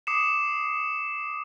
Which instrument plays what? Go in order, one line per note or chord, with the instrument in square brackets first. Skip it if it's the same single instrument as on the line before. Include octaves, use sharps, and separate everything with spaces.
[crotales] D6 D#6 C7 C#7 E7